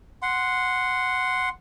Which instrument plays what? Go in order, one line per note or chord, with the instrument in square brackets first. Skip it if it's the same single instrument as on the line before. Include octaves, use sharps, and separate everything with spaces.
[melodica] F#5 C6